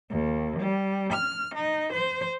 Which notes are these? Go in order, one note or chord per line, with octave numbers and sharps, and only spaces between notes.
D#2
G3
F6
D#4
C5